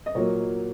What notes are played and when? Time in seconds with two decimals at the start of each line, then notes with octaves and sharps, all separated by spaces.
0.06 D#5
0.15 A#2 F#3 A#3 C#5